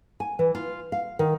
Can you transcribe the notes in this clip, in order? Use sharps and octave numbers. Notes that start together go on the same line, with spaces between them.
G#5
E3
F4
F5
D#3